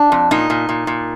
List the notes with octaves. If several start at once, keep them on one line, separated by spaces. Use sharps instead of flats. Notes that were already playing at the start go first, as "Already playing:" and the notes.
Already playing: D4
F2
A#2 D#4
A#2
A#2
A#2